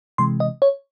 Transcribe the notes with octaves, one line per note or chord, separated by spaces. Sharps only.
C3 E3 G#3 C6
D#5
C#5